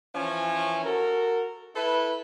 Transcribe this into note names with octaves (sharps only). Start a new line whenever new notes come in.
E3 F3 C#4
F#4 A4 A#4
E4 A4 B4